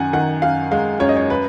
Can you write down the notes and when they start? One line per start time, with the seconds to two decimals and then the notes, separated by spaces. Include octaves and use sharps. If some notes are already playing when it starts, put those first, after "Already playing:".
Already playing: F#2 D#3 F#5 G#5
0.13 D#3 F#5
0.42 F#2 F5
0.72 G#3 F5
1.00 F#2 C#5
1.09 D#5
1.17 C#5
1.30 B4